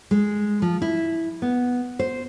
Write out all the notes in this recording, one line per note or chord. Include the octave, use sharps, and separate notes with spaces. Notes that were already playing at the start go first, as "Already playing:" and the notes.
G#3
F3
E4
B3
C5